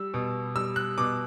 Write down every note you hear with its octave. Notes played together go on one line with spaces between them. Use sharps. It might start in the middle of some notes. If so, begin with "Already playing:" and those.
Already playing: G3 E6
B2
G3 E6
F#6
B2 D6